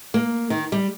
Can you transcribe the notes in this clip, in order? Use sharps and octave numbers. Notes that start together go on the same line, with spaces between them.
A#3
D#3
G3